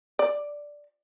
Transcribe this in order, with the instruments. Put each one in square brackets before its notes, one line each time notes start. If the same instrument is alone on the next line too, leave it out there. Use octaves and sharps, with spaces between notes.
[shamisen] D5